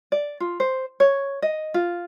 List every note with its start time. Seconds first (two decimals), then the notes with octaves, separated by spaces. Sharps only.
0.12 D5
0.40 F4
0.60 C5
1.00 C#5
1.42 D#5
1.74 F4